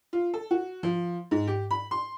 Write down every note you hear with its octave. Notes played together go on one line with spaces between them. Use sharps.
F4
A4
F#4
F3
G#2
G4
B5
C6